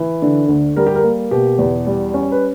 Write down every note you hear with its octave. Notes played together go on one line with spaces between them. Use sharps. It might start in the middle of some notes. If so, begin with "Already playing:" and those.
Already playing: E3
D3
D2
G3 A#4
G4
A#4
A#3
B2 G4
E2
G3
C#4
B4